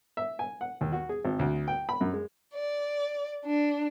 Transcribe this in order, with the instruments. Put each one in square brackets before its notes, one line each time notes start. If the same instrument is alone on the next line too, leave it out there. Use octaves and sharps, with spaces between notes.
[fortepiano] E5
G#5
F#5
D#2
F#4
G#4
G#1
D2
G5
B5
F#2
G#3
[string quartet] D5
D4